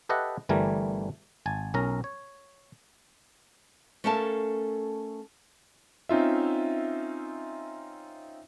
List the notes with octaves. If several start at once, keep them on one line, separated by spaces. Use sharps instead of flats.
G4 A4 B4 D#5 E5 F#5
G1 E3 G3 A3 A#4 G#5
G#1 G#5 A5
B1 C#4 A#4 A#5
C#5
A3 C#4 A4 A#4 F5 A5
C4 C#4 D#4 F4 E5